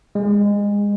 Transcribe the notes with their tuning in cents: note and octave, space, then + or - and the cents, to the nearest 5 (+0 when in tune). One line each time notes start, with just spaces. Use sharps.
G#3 -25